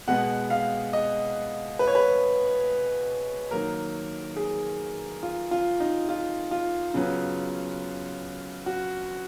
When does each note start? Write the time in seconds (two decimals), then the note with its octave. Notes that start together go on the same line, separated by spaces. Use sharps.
0.08 B2 G#3 B3 F#5
0.50 F5
0.93 D#5
1.79 B4
1.87 C#5
1.95 B4
3.51 D#3 F#3 A#3 A#4
4.36 G#4
5.23 F4
5.51 F4
5.80 D#4
6.09 F4
6.51 F4
6.94 C#3 F#3 B3
8.66 F#4